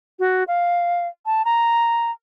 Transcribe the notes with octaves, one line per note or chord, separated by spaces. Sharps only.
F#4
F5
A5
A#5